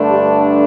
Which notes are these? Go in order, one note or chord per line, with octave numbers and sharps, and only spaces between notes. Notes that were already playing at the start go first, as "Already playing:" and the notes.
Already playing: G2 D3 A3 D4
G4